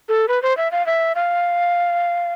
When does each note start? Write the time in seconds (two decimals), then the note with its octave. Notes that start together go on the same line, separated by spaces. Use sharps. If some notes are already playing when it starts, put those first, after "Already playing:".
0.09 A4
0.28 B4
0.42 C5
0.57 E5
0.72 F5
0.86 E5
1.15 F5